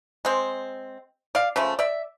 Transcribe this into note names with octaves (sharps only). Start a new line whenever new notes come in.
G#3 C4
D5 F5
C#3 F3 A3
D5 E5